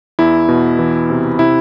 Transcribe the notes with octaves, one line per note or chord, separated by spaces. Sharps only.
E2 E4
B2
E3
C3
C3 E4